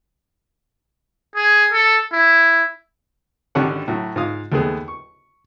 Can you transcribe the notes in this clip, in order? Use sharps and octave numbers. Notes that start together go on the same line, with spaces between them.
G#4
A4
E4
G#1 D3 C#4 D4 G4 F#5
A2 F#3
G#2 F4 F5 D#6
D#2 A3 B3 G#4
C#6